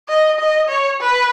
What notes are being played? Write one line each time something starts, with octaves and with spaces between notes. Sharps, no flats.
D#5
D#5
C#5
B4